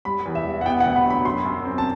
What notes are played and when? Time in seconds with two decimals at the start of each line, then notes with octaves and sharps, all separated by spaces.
0.05 G3 B5
0.25 E2
0.35 E5
0.46 G3
0.61 F#5
0.65 B3 G5
0.80 F#5
0.86 D2
0.96 B5
1.05 F#3
1.10 B5
1.25 F#2 C6
1.45 F#2
1.65 C4
1.78 A5